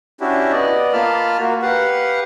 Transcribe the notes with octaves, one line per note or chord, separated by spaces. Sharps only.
C#4 D4 E4 F#4 G4
B3 D5 D#5
A#3 F4 A5 B5 F6
A#3 F#4
G4 B4 F5 F#5